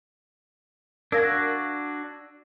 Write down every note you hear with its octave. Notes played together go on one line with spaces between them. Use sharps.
D4 F#4 A#4 F5 E6 G#6 A#6